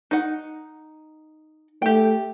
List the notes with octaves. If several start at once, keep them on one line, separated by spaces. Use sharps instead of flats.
D#4 F#5
A3 G4 G5